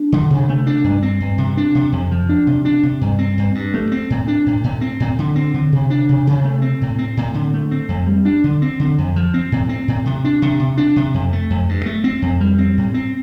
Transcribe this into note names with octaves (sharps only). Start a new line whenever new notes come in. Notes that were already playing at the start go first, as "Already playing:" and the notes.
Already playing: D4
D3
C3
A3
D4
G2
C4
G2
C3
D4
C3
F2
F3
D4
C3
D4
C3
G2
C4
G2
G2
A3
C4
A2
D4
A2
A2
C4
A2
D3
C4
D3
C3
D4
C3
C3
A3
C4
A2
C4
A2
D3
A3
C4
F2
G3
D4
D3
C4
D3
F2
F3
C4
A2
C4
A2
C3
D4
C3
C3
D4
C3
F2
A3
F2
G2
A3
C4
F2
G3
C4
A2
C4